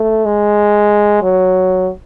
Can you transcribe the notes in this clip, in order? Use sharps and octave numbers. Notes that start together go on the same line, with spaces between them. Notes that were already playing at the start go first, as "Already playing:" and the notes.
Already playing: A3
G#3
F#3